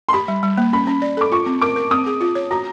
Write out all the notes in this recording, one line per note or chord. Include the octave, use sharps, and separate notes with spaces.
C6
G4 B5
G3
G3
A#3
C#4 B5
C#4
D5
A4 D6
F4 C#6
C4
A#4 D6
A#4
C4 D#6
G#4
F4
C#5
F#4 A#5